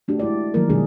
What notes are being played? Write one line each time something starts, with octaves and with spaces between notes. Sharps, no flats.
A3 D4 F#4 G4
G#3 E4 D5
D#3 F3 F#3 A#3 A#4
B2 D#3 G#3 D4 G#4